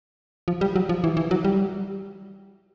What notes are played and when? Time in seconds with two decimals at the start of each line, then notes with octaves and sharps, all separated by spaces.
0.48 F3
0.61 G3
0.76 F#3
0.89 F3
1.04 E3
1.17 E3
1.31 F#3
1.44 G3